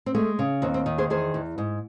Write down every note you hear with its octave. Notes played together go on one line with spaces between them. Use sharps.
C4
G#3 A3
C#3
D#2 C4
C4
D#3
G#4 C5
E2 G#4 C5
E2
G#2